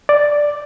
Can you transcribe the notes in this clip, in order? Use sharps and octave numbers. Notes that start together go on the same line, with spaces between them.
D5